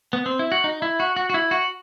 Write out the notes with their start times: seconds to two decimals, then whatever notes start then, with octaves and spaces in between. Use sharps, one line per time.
0.13 B3
0.26 C4
0.39 E4
0.52 F#4
0.64 D#4
0.82 E4
1.00 F#4
1.16 F#4
1.30 F#4
1.34 E4
1.51 F#4